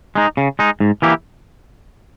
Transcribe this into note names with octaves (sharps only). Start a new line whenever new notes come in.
G#3 D#4
C#3
G#3 D#4
G#2
E3 A#3 E4 G4